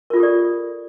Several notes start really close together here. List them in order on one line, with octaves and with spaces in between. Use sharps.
A#4 F4 A4 G4 D5